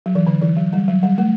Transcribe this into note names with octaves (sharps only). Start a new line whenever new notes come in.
F#3
E3
D3
E3
F#3
G3
F#3
G3
A3